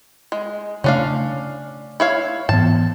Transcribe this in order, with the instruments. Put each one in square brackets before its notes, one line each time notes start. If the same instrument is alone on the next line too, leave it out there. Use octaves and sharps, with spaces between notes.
[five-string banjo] G#3
[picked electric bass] C#3 A3 [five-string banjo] C#4 D4 F5
[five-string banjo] E4 C#5 F5
[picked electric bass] G#2 E3 B3 [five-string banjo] A5